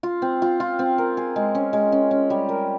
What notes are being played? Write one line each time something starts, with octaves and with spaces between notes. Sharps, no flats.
F4
C4
F4
F4
C4
A#4
G#4
G#3
C#4
G#3
C#4
C#4
G3
A#4